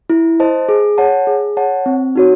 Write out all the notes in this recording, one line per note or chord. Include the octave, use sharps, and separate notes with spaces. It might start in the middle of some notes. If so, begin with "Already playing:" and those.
E4
C5 D#5 A5
G#4
C#5 F#5 A5
G#4
C#5 F#5 A5
C4
D#4 F#4 C#5